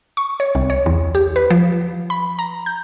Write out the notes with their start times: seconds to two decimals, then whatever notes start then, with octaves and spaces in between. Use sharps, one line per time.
0.17 C#6
0.40 C#5
0.55 C2
0.70 C#5
0.86 E2
1.15 G4
1.36 B4
1.50 F3
2.10 B5
2.39 A#5
2.66 G6